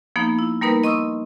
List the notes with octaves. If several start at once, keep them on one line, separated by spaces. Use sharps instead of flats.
F3 A#3 B3 D#4
E4
G3 A#3 B3 D#4 A#4 B4
D#5 C6 C#6 D#6 E6